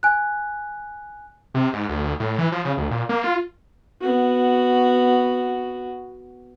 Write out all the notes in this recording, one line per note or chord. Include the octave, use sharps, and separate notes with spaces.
G#5 F#6
C3
G#2
D2
D2
A2
E3
F3
C#3
D2
A#2
A#3
F4
B3 F#4